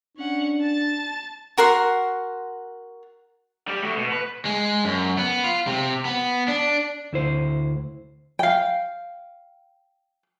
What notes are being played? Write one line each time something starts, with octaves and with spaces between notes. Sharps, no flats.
C#4 D4 F#5
A5 A6
F#4 A#4 F#5 C6
G3 G4
A3 F#4
B2
B4
G#3
F#2
B3
F4
C3
B3
D4
D2 E4 C5
F5 G5